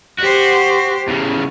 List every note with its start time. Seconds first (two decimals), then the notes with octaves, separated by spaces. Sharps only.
0.20 F#4 G4 C5
1.08 E2 C#3